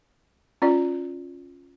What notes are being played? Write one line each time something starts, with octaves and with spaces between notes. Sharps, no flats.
C#4 F4 D5